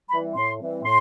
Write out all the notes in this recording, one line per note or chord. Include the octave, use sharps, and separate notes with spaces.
E3 G3 C4 B5
A2 C6
E3 G3 C4
A2 C6